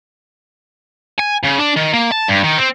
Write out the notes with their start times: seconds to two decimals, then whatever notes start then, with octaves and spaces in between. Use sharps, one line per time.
1.18 G#5
1.43 C#3
1.58 D4
1.76 D#3
1.94 A#3
2.12 A5
2.28 G2
2.44 D#3
2.58 C4